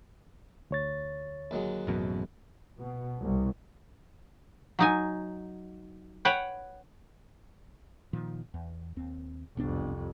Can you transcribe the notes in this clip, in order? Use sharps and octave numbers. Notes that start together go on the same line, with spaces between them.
D2 C#5 A6
D#2 F#3 G#3
A1 F#2 B2
B2
C2
F#3 D#4 G#5
B4 C#5 F#5 G5
A#2 D#3 F3
E2
D#2 C4
E1 C2 F2 B3 D4